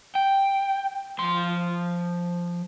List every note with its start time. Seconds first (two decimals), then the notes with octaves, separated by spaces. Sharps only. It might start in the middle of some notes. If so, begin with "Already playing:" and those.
0.15 G5
1.19 F3 C6